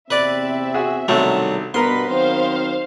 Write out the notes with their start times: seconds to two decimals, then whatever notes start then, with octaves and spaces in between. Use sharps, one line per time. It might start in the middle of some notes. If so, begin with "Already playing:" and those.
0.11 E2 C3 C4 B4 D5 E5
0.74 F#4 G#4
1.08 B1 G2 C3 D#3 F#3 G3 A3 A4
1.74 G2 B2 B3 A#4 B4 A#5 C6 B6
2.08 D#3 F#3 C4 C5 F5